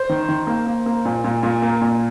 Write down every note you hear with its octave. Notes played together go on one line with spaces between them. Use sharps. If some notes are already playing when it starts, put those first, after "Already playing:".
Already playing: C5 C6
D#3
D#3
A#3
A#3
A#3
A#2
A#2
A#2
A#3
A#2